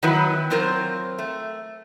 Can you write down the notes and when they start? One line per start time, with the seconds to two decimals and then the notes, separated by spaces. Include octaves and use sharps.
0.03 D#3 F#3 B3 E4 B4
0.50 F#3 C4 F4 A#4 C5
1.18 A3